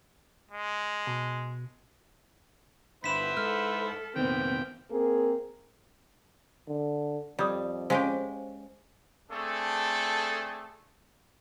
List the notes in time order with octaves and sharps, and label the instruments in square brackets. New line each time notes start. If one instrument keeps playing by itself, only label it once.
[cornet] G#3
[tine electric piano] B2
[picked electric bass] G1 [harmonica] E4 B4 C5 [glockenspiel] B6 E7
[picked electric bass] G#2 [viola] A4 [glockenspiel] F6
[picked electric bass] F1 A#2 D#3 [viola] B3 C4 [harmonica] G5
[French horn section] A#3 C4 G#4 A#4
[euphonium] D3
[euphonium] F2 [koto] G3 [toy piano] D5 D#6
[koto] G#3 C#4 G4 [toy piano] C5 F5 G#5
[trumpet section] A3 C4 D4 G#4 A4